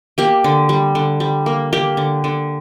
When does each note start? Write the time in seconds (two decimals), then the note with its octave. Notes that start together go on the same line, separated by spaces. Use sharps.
0.18 A#3 G4
0.44 D3
0.69 G3
0.95 D3
1.20 G3
1.46 A#3
1.73 A#3 G4
1.97 D3
2.24 D3